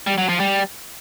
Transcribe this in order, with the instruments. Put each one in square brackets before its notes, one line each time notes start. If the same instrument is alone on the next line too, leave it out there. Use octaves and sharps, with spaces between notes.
[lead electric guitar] G3
F#3
F3
G3